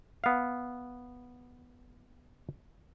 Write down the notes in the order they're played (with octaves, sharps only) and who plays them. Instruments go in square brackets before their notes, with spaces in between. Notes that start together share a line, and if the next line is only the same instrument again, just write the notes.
[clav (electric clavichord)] B3 F5